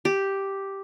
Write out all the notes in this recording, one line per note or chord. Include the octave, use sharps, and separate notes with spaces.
G4